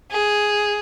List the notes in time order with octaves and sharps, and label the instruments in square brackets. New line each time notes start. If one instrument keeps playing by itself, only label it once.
[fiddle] G#4